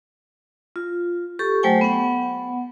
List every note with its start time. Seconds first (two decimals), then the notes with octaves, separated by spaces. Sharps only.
0.76 F4
1.39 G4 A4 C#6
1.63 F#3 A3 C5 G5 G#5
1.81 B3 F#5